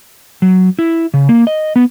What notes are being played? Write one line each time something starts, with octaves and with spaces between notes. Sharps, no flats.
F#3
E4
C#3
A#3
D#5
B3